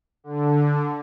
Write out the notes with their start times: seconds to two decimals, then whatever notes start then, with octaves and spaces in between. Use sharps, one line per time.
0.24 D3